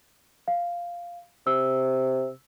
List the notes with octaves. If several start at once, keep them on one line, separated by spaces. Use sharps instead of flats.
F5
C3 E6